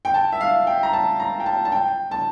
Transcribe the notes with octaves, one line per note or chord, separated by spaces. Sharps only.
G5
A5
E5
F5
G5
A#5
A5
A#5
G5
A5
A5
G5
A5